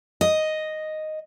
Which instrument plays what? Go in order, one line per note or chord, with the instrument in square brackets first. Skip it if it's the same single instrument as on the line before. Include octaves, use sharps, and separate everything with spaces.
[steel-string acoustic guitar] D#5